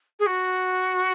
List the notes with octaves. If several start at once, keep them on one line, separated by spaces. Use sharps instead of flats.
G#4
F#4